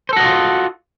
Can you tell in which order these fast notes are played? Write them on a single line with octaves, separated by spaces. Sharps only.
C5 A4 F#4 D#5 F4